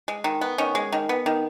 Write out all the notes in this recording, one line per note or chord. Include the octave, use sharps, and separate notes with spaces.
G#3
D#3
B3
D#3 C#4
G#3
D#3
B3
D#3